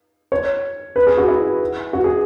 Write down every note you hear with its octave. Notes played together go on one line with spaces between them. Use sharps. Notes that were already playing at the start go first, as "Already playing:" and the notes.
C#5
B4
G#4
F#4
E4
F#4
G#4